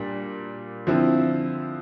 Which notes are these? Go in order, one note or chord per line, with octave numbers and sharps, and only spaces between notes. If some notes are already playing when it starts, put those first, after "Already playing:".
Already playing: A#2 G3 A#3 D4
D3 F3 C4 E4